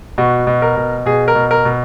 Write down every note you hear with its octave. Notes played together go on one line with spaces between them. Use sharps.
B2 F#4
B2
A#4
B2
B2 G#4
A#4
B2
A#4
B2